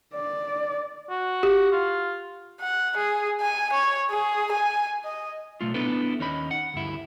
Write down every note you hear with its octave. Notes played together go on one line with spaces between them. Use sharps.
D5
F#4
G4
F4
F#5
G#4
G#5
C#5
G#4
G#5
D#5
B1 A3 F4
B3 D4 E4 A4 B4
D#2 C#4 D#4 B5
F#5
D2 G2 E4